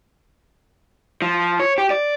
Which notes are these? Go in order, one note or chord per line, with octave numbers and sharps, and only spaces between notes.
F3
C#5
G4
D5